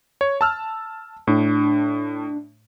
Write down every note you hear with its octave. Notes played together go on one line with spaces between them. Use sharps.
C#5
A5 E6 F6
A2 D4